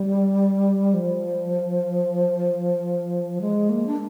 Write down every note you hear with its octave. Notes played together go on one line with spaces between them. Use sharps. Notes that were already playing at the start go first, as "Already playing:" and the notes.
Already playing: G3
F3
G#3
A#3
D4